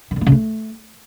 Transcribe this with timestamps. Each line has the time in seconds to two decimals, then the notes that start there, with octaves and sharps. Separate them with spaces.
0.11 D#3
0.16 D3
0.21 A#3
0.27 C#3
0.32 A3